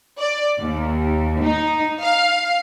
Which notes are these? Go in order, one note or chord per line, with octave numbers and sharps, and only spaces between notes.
D5
D#2
D#4
F5